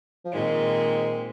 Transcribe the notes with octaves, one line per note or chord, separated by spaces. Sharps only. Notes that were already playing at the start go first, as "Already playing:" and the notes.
F3
A#2 D#3 G#3 C4